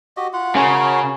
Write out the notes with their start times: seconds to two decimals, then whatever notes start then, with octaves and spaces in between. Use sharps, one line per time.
0.17 F#4 G4 D#5
0.33 F4 F#5
0.56 C#3 F#4 A#4 C#5